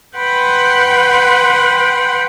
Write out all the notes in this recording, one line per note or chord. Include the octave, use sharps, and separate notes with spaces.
B4 F#5 G5 B5 C6